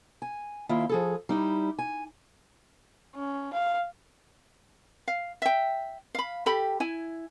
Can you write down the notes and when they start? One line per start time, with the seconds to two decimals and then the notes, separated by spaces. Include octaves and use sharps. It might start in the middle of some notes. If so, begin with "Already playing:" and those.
0.22 G#5
0.69 D#2 E4 F4 E5
0.89 F3 G#4 A4
1.29 G3 D#4 E4
1.79 G#5
3.15 C#4
3.53 F5
5.08 F5
5.42 E5 G5
6.15 F5 B5
6.46 G4 A4 G5 B5
6.80 E4 G#5